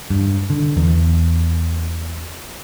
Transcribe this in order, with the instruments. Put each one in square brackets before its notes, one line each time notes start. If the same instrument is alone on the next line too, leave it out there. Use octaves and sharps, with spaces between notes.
[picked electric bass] G2
D3
E2